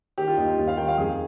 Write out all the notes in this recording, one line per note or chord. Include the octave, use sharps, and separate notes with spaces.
D#3 G4
F4
D#2 D#4
F4
D#2
F5
D#3 G5
F5
F2 G#4